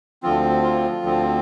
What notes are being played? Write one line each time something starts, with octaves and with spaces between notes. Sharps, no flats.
D2 D3 F3 C4 F4
F4
D2 D3 F3 C4